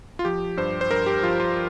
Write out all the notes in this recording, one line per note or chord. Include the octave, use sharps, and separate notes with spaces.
F4
F3 G4
G2 C5
C5
G2 A#4
G4
F3 F4
F4